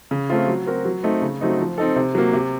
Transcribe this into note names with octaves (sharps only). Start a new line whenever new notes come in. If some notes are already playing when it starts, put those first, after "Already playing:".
C#3
A3 C4 F4
F#3
C4 F#4 A#4
F#3
A3 C4 D#4
C#3
F#3 A3 C4 D#4
F3
C4 D#4 A4
C3
F#3 A#3
C3